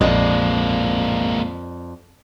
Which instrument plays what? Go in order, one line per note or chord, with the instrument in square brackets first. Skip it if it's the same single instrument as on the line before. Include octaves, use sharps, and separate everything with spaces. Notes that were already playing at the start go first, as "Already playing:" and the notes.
[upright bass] A#1 G#2 [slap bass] F2 [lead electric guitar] G#3 A#3 [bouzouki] D4 D#5